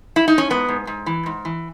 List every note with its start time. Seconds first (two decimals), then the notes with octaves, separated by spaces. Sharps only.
0.16 E4
0.28 D#4
0.38 C#4
0.50 G#2 B3
0.69 G#2
0.87 G#2
1.06 E3
1.26 G#2
1.45 E3